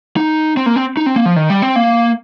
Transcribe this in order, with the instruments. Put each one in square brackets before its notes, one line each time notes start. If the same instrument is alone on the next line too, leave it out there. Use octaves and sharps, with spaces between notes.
[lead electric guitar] D#4
C4
A#3
C4
D#4
C4
A#3
F3
D#3
G3
C4
A#3